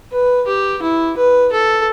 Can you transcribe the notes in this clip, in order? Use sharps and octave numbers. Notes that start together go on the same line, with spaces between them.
B4
G4
E4
B4
A4